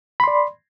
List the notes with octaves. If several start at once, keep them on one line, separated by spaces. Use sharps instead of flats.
D5 B5 C6